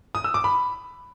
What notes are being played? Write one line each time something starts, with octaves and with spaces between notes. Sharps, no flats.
D#6
E6
D6
B5